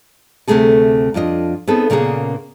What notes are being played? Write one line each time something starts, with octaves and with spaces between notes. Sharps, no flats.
D2 C3 F#3 A3 G#4 A4
F2 D4 F4 D#5
B3 C4 D#4 G#4 A4
A#2 C#3 A#3 B3 G#4